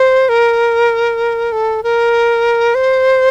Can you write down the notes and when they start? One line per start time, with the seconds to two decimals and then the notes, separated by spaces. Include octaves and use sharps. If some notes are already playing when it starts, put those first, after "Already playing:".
Already playing: C5
0.29 A#4
1.52 A4
1.83 A#4
2.75 C5